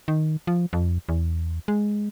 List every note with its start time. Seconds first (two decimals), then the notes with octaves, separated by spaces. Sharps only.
0.08 D#3
0.47 F3
0.73 F2
1.09 E2
1.68 G#3